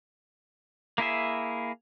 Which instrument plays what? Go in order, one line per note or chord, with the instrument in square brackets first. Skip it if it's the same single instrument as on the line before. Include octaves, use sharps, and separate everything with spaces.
[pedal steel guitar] A#3 E4 G#4 E5